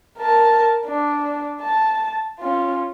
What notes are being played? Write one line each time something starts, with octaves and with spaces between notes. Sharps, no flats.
A#4 A5
D4
A5
C#4 F4